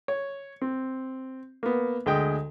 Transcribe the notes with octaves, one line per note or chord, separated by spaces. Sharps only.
C#5
C4
A#3 B3
D2 G#3 D#5 G5